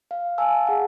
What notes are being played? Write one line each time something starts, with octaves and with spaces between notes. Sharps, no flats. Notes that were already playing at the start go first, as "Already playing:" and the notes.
F5
F5 G#5 A5 E6
G#4 F#5